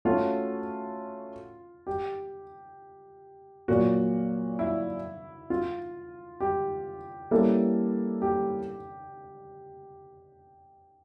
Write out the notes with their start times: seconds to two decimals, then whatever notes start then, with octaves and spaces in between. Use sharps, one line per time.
0.05 A3 C#4 F4 F#4
1.87 G4
3.68 A#2 F#3 A#3 F#4
4.59 E4
5.50 F4
6.40 G4
7.31 G3 A#3 C#4 E4 A4
8.22 G4